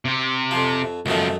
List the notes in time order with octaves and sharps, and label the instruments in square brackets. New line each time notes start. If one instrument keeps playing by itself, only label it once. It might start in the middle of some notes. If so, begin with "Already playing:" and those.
[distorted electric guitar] C3 G4
[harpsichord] F2 F3
[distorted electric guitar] C#2 F3 [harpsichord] F#2 D#3 A3